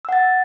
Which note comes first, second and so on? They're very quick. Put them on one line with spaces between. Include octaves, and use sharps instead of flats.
E6 F#5 A6